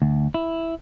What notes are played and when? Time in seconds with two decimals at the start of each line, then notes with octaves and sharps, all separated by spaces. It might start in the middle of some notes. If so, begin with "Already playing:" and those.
0.02 D2
0.34 E4